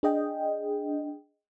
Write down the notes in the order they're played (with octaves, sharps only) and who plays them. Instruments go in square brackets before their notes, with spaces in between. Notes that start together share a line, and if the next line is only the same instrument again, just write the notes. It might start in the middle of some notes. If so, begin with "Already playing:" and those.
[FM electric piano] D4 G#4 D#5 G5